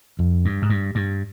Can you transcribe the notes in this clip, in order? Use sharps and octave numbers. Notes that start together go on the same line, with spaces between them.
F2
G2
G#2
G2
G2